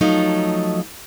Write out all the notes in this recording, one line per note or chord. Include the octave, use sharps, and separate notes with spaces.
F3 F#3 A3 D#4